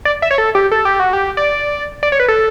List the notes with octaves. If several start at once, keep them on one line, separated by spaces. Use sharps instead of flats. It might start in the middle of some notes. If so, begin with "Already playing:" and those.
D5
E5
C#5
A4
G4
A4
G4
F#4
G4
D5
D5
C#5
B4
A4